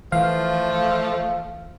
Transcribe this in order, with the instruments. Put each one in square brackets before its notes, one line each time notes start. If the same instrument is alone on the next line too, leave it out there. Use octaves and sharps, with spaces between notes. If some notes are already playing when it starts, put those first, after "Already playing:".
[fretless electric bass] E3 [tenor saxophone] F3 [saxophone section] A3 [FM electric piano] F5